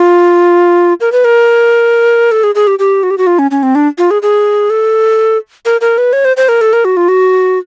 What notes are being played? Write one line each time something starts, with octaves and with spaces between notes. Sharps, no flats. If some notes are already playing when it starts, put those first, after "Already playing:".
Already playing: F4
A#4
B4
A#4
A4
G#4
G#4
G4
G4
F#4
G4
F#4
F4
C#4
C#4
C4
D4
F4
G#4
G#4
A4
A#4
A#4
B4
C#5
C5
C5
A#4
A4
A#4
F#4
F4
F#4